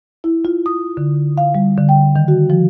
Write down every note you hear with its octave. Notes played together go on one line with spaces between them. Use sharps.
E4
F4
D#6
D3
F5
G3
D3
G5
D#3
F#4
F3